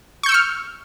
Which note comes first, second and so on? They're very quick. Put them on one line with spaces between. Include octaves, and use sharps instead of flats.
C#6 G6 E6 C#7 F6